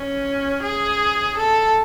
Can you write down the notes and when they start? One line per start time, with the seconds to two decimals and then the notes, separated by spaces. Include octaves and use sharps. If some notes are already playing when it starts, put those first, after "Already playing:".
Already playing: C#4
0.63 G#4
1.37 A4